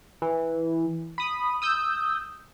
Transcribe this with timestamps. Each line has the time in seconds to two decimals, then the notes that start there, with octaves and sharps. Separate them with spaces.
0.22 E3
1.18 B5 D#6
1.62 D#6 E6 G6